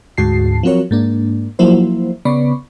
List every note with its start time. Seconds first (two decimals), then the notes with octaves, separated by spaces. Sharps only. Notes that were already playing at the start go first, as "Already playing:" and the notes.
0.18 D2 G#2 F#4 A5 C7
0.63 F3 F#3 C4 F#4 A#4 C#5
0.91 G#2 A#3 D4
1.59 F3 F#3 A#3 E4 C5
2.25 C#3 B3 D5 B5 C#6